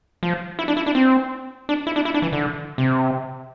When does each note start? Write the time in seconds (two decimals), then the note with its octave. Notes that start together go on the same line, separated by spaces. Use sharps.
0.23 F3
0.59 E4
0.68 D4
0.77 E4
0.86 D4
0.95 C4
1.69 D4
1.87 E4
1.96 D4
2.05 E4
2.14 D4
2.22 E3
2.33 D3
2.78 C3